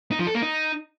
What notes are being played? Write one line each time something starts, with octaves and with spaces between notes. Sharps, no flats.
D#4
F3
A4
A#3
D#4